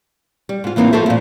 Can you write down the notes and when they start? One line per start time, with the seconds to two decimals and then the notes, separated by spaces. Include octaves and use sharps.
0.49 G3
0.64 G#2 F4
0.76 A2 E3 A#3 C4 D#4
0.93 F3 F4 F#4 A4 C5 E5
1.06 A#2 F3